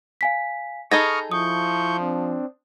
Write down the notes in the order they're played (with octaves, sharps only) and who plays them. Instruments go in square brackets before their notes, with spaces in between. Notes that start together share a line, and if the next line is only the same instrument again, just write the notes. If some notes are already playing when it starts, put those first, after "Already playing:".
[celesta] F5 G#5 B6
[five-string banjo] D#4 G#4 A4 [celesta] B5 A#6 [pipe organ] C#6 D#6 F6
[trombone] F3 [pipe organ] E4 C#6 G6 [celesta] D#6
[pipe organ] C4 D4